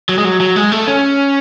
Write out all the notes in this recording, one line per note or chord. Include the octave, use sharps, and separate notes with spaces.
F#3
G#3
F#3
F#3
G#3
A3
C#4